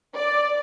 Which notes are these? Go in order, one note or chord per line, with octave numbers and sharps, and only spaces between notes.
D5